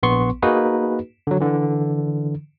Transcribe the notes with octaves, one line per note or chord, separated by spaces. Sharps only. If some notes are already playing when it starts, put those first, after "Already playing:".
A#1 B3 C6 C#6
A#3 D#4 F#4 G#4 B4
D3 F#3
D3 E3